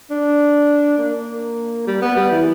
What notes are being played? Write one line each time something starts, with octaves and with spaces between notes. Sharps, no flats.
D4
A#3
G3
B3
G3
E3